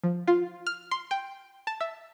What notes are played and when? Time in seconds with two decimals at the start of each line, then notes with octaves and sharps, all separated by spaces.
0.04 F3
0.27 F4
0.67 F6
0.91 C6
1.11 G5
1.67 A5
1.81 E5